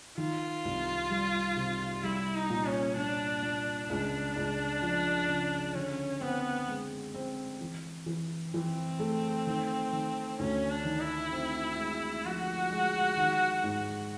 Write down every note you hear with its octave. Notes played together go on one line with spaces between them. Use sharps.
D#3 F4
C2
G3
C3
G3 E4
D#4
A#2
C#4
A#2 D4
A#2
C#2 D4
C#2
F3
C#3
D3 C#4
B3 C4
G#3
C4
E3
E3
E3 C4
A3
D#3
D#3
D2 C#4
D4
D#3
E4
C4
G#3
F3 F#4
G#3
D#3
G#2